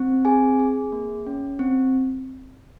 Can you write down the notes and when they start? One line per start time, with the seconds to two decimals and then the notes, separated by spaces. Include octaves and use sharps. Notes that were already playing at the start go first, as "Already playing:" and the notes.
Already playing: C4
0.25 G#4 G#5
0.59 G#4
0.92 A#3
1.27 C#4
1.59 C4